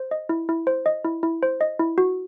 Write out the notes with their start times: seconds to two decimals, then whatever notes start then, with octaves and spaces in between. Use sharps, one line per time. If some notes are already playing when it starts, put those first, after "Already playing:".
Already playing: C5
0.11 D#5
0.29 E4
0.49 E4
0.67 C5
0.86 D#5
1.05 E4
1.23 E4
1.43 C5
1.61 D#5
1.79 E4
1.98 F#4